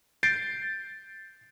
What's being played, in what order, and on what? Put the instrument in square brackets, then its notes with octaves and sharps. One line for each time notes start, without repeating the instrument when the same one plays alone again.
[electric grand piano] G6 A6 C7 D7